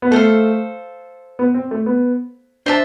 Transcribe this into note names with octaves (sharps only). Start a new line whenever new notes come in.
B3
A3 A4 C5 F5
B3
C4
A3
B3
D4 C5 E5 A5